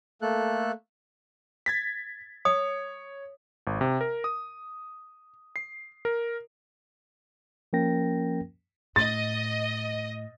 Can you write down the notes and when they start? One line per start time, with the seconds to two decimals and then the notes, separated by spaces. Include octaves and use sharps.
0.22 A3 A#3 A4 F#6
1.66 G#6 A6 B6
2.45 C#5 D#6
3.67 G#1
3.81 C3
4.01 A#4
4.24 D#6
5.56 C7
6.05 A#4
7.73 F3 A#3 C#4 A#4 G5 A#6
8.96 A2 D#5 A6